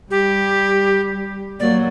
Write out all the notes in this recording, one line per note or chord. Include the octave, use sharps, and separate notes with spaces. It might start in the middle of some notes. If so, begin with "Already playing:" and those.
G3 G4
F#3 A#3 D5